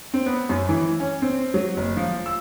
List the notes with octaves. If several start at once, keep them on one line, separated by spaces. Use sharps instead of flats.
C4
B3
F#2
E3
C#4
C4
F#3
F#1
F3
E6